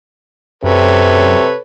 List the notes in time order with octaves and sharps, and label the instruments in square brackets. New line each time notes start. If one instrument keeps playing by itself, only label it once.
[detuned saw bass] F#2 [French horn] C3 [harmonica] A4 B4 C#5